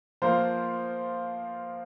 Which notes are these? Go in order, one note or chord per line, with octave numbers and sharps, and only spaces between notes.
F3 A#3 F4 C5